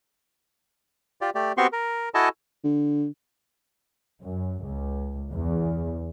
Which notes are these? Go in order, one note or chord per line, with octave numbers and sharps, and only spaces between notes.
F4 G4 D5
A3 G4 D5
B3 C4 F#4 G4 C6 C#6
A#4
E4 F#4 A4 D#5 G#5 A5
D3
F#2
C#2
E2